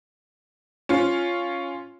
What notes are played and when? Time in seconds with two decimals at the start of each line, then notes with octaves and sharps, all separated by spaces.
0.89 C#4 F4